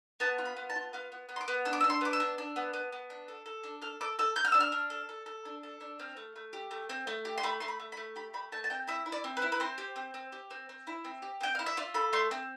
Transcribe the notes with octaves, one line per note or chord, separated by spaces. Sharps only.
B3 A5
F4
B5
B3
A5
F4
B3 F5
B3
B3
C6
D6
B3
D4 E6
D6
E6
D4
C6
B3 D6
E6
D4
D4
B3
B3
B3
D4
A4
A4
D4
A4 F6
A4 D6
A4 E6
A4 G6
F6
D4 E6
F6
D4
A4
A4
A4
D4
A4
D4
C4 F6
A3
A3
G4
A3
C4
A3
G4
C6
A3 B5
A3 C6
B5
A3
B5
A3
G4 B5
A3 B5
A3 A5
A5
C4 G5
E4 E5
E4
D5
C4
B4
E4
B4
C4 C5
G4
C4
C4
G4
C4
C4
E4
C4
G4
C4 G5
E4 F5
E5
F4 D5
A4 B5
A3 C6
C4